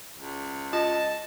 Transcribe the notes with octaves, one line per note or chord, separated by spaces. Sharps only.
C#2
F4 D#5 A5